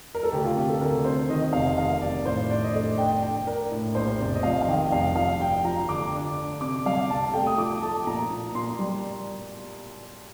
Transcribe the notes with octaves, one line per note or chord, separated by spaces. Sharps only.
A#4
A4
D2 G4
F4
C3 G4
A4
D2 A#4
C3 C5
D#3 D#5
D#5
F1 F5
D#3 F5
F1 D5
A2 C5
D4 D5
D#5
A3 D5
D4 G5
D4 G5
D4 A#4
A2
A#1 C5
F1 D5
D#5
F2 F5
F5
D#3 G5
G5
F1 F5
F3 F5
G2 G5
F3 A#5
D3 D6
D4
D4
C3 D6
G3 F5
C2 A5
A3 G5
D#6
F3 D6
A3 A5
A#2 A#5
A#2
A#2 C6
G3